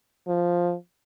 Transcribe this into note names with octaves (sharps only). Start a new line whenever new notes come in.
F3